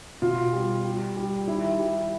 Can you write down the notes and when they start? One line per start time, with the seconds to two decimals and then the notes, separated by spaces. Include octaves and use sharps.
0.22 B2 F4
0.53 G3
0.84 G3
1.16 G3
1.47 D#3 E4
1.79 G3